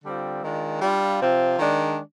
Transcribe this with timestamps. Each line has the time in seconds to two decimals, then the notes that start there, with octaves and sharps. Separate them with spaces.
0.04 D3 G3 C4 F4
0.43 D#3 G#3 D4 F4
0.81 G3 D4 F4
1.21 C3 F3 C4 F4
1.59 D#3 G#3 D4